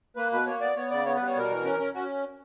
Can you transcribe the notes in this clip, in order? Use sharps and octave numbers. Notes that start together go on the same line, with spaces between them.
A#3 B4
B2 B4
A#3 C#5
B3 D5
B3 C#5
C#3 D5
B3 C#5
G3 B4
C#5
B2 A#4
E3
C#4
C#4
C#4 F#4